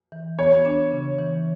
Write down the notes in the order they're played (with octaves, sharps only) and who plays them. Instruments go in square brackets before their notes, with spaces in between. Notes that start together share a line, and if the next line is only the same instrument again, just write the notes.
[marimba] E3
[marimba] B3 [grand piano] C#5
[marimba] D4
C#3
E3